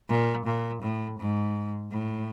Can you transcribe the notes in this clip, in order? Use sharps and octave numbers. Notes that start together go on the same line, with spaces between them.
A#2
A#2
A2
G#2
A2